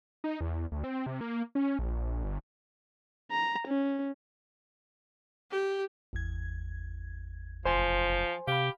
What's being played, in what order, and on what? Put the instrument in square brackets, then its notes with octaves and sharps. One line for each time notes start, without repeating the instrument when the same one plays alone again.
[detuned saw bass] D#4
E2
D2
C4
C3
A#3
C#4
A#1
G1
[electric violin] A#5
C#4
[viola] G4
[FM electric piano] G#1 E2 G#6
[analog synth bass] F#1 [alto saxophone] F3 [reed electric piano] C5 G#5 C6
[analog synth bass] C3 [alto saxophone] G4 [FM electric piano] F5 B5